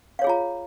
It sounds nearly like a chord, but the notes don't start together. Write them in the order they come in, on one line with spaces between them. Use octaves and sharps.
F5 C#5 G#4 F4 A#5